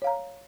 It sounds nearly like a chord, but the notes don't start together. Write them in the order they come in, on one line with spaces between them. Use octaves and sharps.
C#5 F5 A#5